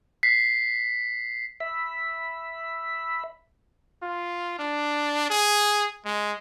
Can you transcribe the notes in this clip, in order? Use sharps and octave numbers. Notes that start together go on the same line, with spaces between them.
B6 C7
E5 B5
F4
D4
G#4
G#3